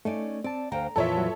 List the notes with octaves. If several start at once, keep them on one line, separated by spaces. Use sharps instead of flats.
A3 C#4 D#4 D5
C4 D5 A5
D2 C5 F5 G5 A#5
F2 A#2 E3 F4 A4 C#5 E5
F#3 F#4